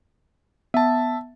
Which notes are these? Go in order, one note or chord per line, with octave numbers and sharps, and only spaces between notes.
B3 E5 A5